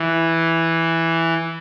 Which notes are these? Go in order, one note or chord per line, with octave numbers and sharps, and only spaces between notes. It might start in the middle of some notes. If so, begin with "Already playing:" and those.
Already playing: E3